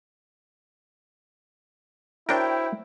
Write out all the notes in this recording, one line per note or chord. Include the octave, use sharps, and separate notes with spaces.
D4 E4 F#4 A#4 C5 C#5 G5